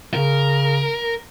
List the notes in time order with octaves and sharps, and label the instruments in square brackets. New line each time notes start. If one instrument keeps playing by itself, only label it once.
[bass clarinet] C#3 [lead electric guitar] A#4